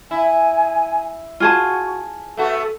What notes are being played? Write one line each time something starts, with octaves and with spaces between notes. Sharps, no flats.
E4 G#5
F4 F#4 G#4 A5
A3 B3 F#4 A4